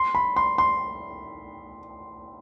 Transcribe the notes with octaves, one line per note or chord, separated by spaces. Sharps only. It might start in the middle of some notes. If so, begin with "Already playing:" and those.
Already playing: C6
B5
C6
C6